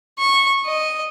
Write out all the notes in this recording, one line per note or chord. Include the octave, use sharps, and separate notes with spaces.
C#6
D#5